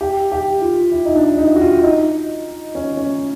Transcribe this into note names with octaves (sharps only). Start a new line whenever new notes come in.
G4
G4
F4
E4
D#4
D4
D#4
F#4
F4
D#4
C#4
C#4